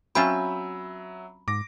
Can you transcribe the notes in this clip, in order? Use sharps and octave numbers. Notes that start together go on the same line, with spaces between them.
F#3 C4 C#4 F4 E5 B5 E6
G#2 D6 A#6